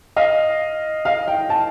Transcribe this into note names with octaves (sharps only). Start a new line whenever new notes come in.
D#5 F5
D#5 F5
F5 G5
G5 A5